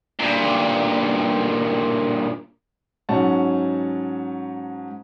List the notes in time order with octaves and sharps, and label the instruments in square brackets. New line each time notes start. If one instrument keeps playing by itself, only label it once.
[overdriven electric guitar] G2 A#2
[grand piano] G#2 F#3 C#4 F#5 A5